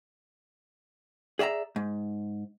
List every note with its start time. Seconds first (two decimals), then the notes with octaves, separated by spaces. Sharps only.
1.39 G#4 D5 E5 F5 A#5
1.76 G#2